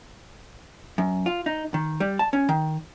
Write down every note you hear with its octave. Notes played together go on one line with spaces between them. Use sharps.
F#2
F4
D#4
D#3
G3
A5
C#4
D#3